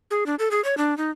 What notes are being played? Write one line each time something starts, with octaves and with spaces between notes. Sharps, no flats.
G#4
D4
A4
G#4
C#5
D4
D#4